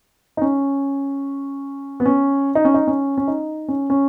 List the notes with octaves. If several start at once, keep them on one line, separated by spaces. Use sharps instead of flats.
D#4
C#4
B3
C#4
D#4
C#4
D#4
C#4
C#4
D#4
C#4
C#4